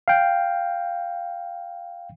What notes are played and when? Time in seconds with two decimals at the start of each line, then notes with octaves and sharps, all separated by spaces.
0.08 F5 G5